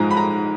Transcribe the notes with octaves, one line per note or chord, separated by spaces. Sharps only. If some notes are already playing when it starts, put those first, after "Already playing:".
Already playing: G#2 F3 G#3 A#5
B5
A#5